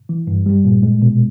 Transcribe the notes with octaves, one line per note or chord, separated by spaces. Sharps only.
E3
G2
G3
A#2
G#3
B2